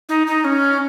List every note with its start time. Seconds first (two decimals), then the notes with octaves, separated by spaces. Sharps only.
0.09 D#4
0.27 D#4
0.44 C#4